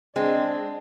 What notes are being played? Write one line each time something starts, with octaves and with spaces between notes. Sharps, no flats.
G#3 C4 D4